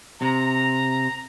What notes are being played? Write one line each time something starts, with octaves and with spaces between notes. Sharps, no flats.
C3 A#5